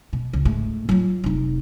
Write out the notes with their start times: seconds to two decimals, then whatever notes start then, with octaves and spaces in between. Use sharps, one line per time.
0.13 B2
0.33 C#2
0.45 G#2 A3
0.89 F#3 F4
1.24 F1 D#4